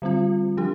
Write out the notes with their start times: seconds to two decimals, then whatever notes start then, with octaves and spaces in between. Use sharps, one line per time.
0.02 D3 G3 C4 F4
0.57 F3 D4 G4